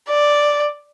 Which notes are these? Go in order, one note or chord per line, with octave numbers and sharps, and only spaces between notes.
D5